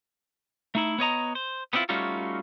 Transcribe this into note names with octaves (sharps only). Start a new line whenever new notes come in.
A3 D#4 E4
B3 C#5 D#5 A#5
C5
B3 C4 D4 E4 F4
G3 A3 C#4 D#4 F4 F#4